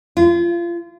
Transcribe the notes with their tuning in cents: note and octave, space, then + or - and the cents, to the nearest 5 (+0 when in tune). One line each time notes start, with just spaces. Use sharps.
F4 -30